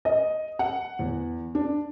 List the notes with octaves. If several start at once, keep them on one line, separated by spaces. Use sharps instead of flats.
D#5
F#5
E2
D4